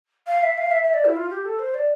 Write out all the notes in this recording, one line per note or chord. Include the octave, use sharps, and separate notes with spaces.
F5
E5
F5
E5
E5
D5
E4
F4
G4
A4
C5
D5